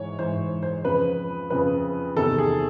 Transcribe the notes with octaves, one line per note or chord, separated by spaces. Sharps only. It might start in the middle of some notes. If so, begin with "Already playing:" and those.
Already playing: G#2 E3 C#5
G#2 E3 C5
C5
F2 C#3 F3 B4
F2 C#3 F3 B4
E2 C3 D#3 A4
G#4